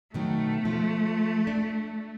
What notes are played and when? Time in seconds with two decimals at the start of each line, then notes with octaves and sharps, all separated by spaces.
0.14 B2 D#3 F#3 A3
0.65 F3
1.47 D4